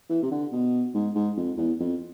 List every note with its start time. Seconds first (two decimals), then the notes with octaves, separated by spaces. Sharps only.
0.10 E3
0.23 C3
0.31 D3
0.52 B2
0.95 G#2
1.15 G#2
1.37 F2
1.58 E2
1.80 F2